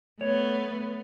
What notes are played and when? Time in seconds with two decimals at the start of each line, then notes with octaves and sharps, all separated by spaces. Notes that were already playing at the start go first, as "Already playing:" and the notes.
0.21 A3 B3 C#5